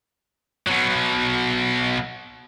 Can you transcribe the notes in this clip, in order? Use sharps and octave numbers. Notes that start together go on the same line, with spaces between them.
B2 F#3